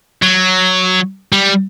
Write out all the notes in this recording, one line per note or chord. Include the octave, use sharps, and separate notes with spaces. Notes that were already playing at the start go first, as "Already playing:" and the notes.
F#3
G3